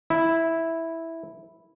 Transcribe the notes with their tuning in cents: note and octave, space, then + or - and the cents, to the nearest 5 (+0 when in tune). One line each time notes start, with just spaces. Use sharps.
E4 -5